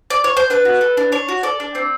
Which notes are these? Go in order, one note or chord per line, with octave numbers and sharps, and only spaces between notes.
D5
C#5
C5
D4 B4
F#4
A4
D4
D4 C#5
F#4
A4 D5
D4
C4